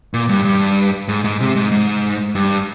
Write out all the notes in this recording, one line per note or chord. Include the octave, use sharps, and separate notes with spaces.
A#2
G2
G2
G#2
G#2
C3
G#2
G#2
G2